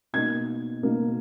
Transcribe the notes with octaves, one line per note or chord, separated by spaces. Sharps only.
B2 A#3 D#4 G#6
B2 A#3 D#4